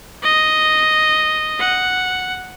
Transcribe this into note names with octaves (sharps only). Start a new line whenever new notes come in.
D#5
F#5